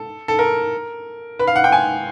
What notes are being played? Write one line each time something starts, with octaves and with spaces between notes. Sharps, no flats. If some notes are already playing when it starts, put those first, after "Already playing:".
Already playing: A4
A4
A#4
B4
F5
F#5
G5
G#5